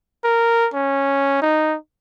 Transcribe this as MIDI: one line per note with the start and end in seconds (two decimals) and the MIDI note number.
0.24 0.68 70
0.74 1.40 61
1.41 1.77 63